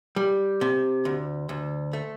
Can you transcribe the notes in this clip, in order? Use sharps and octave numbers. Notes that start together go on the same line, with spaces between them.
G3
C3
D2
D2
A3